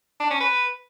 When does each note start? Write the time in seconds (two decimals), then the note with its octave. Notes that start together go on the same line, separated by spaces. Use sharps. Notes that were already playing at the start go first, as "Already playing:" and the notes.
0.20 D4
0.30 C#4
0.40 B4